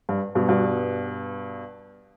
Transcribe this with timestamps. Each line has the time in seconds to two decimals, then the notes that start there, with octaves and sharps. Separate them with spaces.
0.09 G2
0.35 G2 B2
0.49 G2 B2